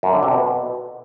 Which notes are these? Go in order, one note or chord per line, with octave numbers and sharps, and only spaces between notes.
F#2
D3
C3
B2